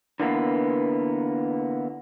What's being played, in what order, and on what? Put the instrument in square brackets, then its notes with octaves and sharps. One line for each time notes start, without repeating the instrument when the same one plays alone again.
[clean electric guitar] D3 E3 A#3 B3